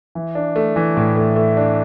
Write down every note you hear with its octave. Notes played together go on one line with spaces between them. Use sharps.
E3
D4
A3
E3
A2
A3
A3
D4